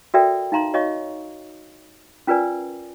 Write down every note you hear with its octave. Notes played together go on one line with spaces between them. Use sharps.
F#4 A4 A#4 D5 E5 G5
D#4 F5 A#5 C6
F#4 C#5 D#5 F5 C#6
C#4 F4 A#4 B4 D5 G#5